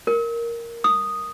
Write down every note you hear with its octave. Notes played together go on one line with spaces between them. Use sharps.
A#4
D#6